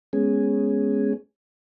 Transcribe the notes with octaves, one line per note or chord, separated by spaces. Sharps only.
G#3 B3 C#4 G#4